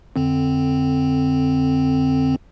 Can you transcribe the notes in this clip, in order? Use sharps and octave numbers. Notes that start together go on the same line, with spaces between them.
F2 D3 C4